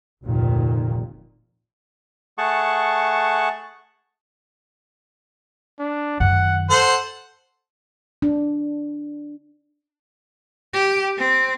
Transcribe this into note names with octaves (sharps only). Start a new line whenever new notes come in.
F1 D2 A#2 D#3
A3 G#4 F#5 A5 C#6
D4
F#2 D#3 F#5
A4 C5 F#5
D4
G4
C4